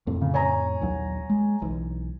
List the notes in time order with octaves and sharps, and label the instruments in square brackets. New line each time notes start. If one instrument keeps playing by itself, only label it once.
[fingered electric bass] F2 A2 C3
[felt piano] C#3
C#5 G#5 A#5
[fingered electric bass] A#1 D#2 F#3
G#3
B1 E3